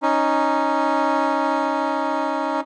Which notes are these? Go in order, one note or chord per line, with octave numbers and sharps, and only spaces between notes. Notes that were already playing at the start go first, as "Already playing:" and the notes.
C#4 D#4